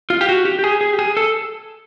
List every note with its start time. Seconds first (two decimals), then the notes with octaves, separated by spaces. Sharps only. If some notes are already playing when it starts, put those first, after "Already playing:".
0.10 F4
0.21 G4
0.29 F#4
0.45 G4
0.59 G4
0.64 G#4
0.81 G#4
0.93 G4
0.99 G#4
1.17 A4